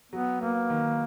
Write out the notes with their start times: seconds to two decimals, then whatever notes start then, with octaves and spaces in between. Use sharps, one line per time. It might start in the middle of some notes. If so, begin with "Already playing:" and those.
0.12 F#3 B3
0.41 A#3 B3
0.70 D#3